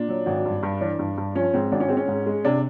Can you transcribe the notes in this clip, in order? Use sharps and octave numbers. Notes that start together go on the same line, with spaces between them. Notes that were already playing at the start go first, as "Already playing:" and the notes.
Already playing: A#2 D4
F#3
G#1
G2
G2
E3 D4
G2
G2
F3 C#4
G#2 C4
G#1 D4
C#4
G#3 C4
C#4
G#2
G#3
C3 D4